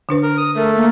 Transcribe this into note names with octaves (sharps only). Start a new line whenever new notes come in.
D3 D4 B4
A#4
D#6
A3 A#4
A#3